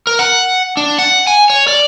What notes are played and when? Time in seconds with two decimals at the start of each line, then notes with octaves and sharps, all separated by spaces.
0.07 A#4
0.19 F#5
0.77 D4
0.99 F#5
1.27 G#5
1.50 C#5
1.67 D5